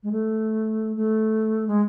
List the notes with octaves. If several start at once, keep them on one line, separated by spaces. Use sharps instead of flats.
G#3
A3
A3
G#3